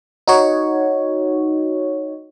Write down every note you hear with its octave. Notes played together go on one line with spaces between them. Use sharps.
D#4 F#4 C#5